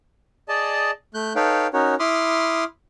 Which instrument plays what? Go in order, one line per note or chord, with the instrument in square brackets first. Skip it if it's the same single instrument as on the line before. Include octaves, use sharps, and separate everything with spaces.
[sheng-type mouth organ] G#4 D5 D#5 A5
A3 F#6 G6
D#4 A4 B4 C#5 F5 G5
C#4 D#4 F#4 A#4 C#5
E4 B5 C6 D6 D#6 F6